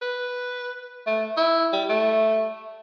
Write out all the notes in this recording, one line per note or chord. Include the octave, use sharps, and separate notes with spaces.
B4
A3
E4
G3
A3